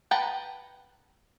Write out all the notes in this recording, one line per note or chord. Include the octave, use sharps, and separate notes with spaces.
B4 F#5 G5 A5 A#5